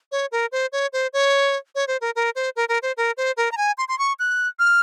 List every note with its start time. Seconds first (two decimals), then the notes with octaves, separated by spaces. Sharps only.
0.12 C#5
0.32 A#4
0.52 C5
0.72 C#5
0.93 C5
1.13 C#5
1.75 C#5
1.88 C5
2.01 A#4
2.16 A#4
2.35 C5
2.56 A#4
2.69 A#4
2.83 C5
2.97 A#4
3.17 C5
3.37 A#4
3.52 A#5
3.57 G#5
3.78 C6
3.88 C6
3.99 C#6
4.19 F#6
4.59 F6